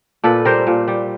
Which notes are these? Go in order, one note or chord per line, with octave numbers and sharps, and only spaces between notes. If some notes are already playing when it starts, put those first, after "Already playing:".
A#2 A4 B4
G3 A#4 C5
A#2
G3